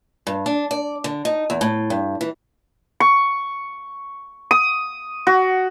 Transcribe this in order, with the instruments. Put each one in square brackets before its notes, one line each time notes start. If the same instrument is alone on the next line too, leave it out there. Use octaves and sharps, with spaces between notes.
[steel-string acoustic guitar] G2
D4
D5
D3
D#4
E2
A2
G2
E3
[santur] C#6
D#6
F#4